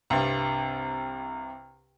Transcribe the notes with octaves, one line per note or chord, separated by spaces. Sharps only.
C2 G2